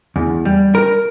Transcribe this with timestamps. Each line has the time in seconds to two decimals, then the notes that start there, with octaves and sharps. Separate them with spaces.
0.16 E2
0.45 G3
0.75 A#4